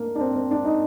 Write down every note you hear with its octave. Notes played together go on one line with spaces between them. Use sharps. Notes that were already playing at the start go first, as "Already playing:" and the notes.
Already playing: A#3 D4
D4
C4
C4
D4
D#4